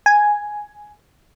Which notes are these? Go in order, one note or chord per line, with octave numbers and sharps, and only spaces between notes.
G#5